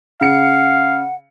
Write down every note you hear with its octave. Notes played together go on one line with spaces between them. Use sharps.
C#3 F5 F#5 C#7